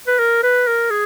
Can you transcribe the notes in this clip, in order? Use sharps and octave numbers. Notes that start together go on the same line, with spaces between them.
B4
A#4
B4
A#4
G#4